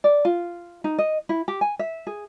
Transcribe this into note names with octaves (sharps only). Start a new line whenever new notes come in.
D5
F4
D#4
D#5
E4
G4
G#5
E5
G#4